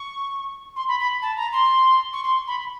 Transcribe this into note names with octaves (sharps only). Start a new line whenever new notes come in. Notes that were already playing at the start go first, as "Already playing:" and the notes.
Already playing: C#6
C6
B5
B5
A5
A#5
C6
C#6
C6
B5